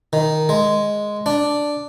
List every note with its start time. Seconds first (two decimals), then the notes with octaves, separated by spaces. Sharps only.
0.13 D#3
0.49 G#3
1.26 D4